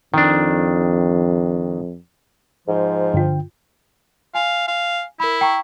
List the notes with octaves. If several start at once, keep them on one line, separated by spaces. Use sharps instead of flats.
F2 D#3 D4
G#2 F3
G2 D3 F4 G5
F5 G#5
F5
E4 A#4 B5
G5 A#5 C#6